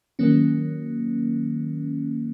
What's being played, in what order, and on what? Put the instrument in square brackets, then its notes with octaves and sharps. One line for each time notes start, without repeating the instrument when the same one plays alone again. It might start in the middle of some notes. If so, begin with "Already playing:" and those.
[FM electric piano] D#3 F#3 A#3 C#4